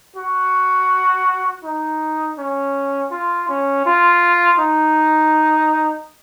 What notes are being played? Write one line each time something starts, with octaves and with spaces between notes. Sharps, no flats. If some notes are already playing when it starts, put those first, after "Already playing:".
F#4
D#4
C#4
F4
C#4
F4
D#4